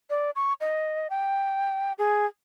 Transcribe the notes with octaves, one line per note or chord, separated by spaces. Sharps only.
D5
C#6
D#5
G5
G#4